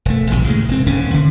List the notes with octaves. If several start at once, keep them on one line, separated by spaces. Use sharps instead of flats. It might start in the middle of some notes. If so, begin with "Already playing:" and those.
E1 A3
A#1 D#2 C3
A2 C#3 E3 G#3
E1 C4
D#1 D#2 C#3 C#4
D3